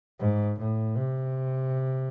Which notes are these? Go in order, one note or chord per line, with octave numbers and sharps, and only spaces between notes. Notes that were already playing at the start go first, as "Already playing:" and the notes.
G#2
A2
C3